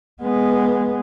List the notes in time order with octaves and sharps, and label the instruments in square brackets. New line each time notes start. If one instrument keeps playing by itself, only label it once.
[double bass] G#3 B3